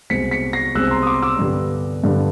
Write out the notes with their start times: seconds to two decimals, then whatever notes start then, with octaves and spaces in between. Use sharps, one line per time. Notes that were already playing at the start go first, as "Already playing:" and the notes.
0.10 C2 B2 G#3 C4 B6 C#7
0.31 B6 C#7
0.53 A#6 C7
0.75 C2 B2 G#3 C4 E6 F#6
0.91 A#5 C6
1.03 D#6
1.06 C6 D6
1.22 D6 E6
1.39 G2 D3 G3 B3
2.04 G2 D3 G3 B3